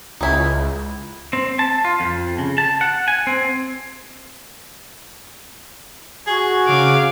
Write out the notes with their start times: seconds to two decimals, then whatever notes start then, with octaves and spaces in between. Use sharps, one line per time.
0.21 C#2 D#4 E4
1.33 C4
1.59 A5
1.85 F4
2.00 F2
2.38 C#3
2.58 A5
2.81 F#5
3.08 G#5
3.27 C4
6.27 F#4 G#4
6.65 C#3 F5 D6